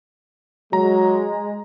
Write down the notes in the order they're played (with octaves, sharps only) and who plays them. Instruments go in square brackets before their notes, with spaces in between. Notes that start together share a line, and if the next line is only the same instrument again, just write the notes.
[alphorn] F#3 [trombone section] G#3 [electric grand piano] A#5